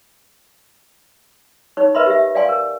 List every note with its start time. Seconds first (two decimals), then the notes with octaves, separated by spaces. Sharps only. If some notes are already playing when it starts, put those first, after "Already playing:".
1.77 D#4 C#5 C#6
1.95 A#4 B4 D#5 E5 B5 C6
2.06 G4 E5
2.35 D5 F5 G5 G#5 C6 C#6
2.49 A#4